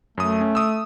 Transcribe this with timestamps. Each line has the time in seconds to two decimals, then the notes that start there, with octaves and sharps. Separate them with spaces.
0.18 F#2 A3 D#6
0.41 C#4
0.55 D#6 E6